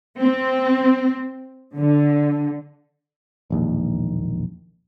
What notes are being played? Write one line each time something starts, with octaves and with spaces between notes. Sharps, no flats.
C4
D3
E1 A#1 D#2